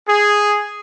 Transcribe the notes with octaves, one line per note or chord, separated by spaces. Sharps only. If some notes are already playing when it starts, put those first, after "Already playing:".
G#4